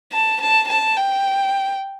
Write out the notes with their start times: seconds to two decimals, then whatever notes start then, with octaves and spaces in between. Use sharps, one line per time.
0.12 A5
0.41 A5
0.68 A5
0.97 G5